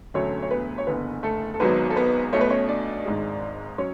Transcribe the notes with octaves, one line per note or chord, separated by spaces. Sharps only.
E1 D2 D3 F#3 A3 C#4 C#5
C#5
B3 B4
C#5
F#1 E2 D3 B3 B4
A3 A4
A4
G#1 G#2 F#3 B3 B4
A4
B3 B4
B1 B2 A3 C#5
B4
C#4 C#5
D4 D5
G#1 G#2 G#3
F#3 C#4 C#5